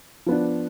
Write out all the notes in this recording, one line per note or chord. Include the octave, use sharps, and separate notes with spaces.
F3 B3 D4